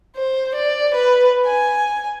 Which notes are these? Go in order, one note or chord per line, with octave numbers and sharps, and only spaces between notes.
C5
D5
B4
G#5